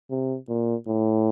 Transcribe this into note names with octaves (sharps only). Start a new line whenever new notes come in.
C3
A#2
A2